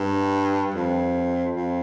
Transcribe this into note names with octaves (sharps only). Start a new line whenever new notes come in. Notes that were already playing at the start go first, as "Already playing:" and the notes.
Already playing: G2
F2
F2